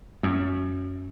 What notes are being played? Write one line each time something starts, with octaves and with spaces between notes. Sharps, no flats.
F#2